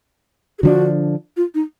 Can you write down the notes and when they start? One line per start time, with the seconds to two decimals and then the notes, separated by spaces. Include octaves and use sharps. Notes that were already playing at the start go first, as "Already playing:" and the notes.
0.59 G#4
0.63 D3 F3 G#3 D4 F#4
1.37 F4
1.55 D#4